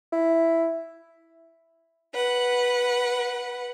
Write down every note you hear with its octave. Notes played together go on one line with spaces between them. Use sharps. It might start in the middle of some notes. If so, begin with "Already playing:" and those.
E4
B4 F#5